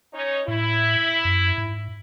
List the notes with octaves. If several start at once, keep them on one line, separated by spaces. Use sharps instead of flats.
C#4 D#4 C#5
A2 E4
F#2
G#2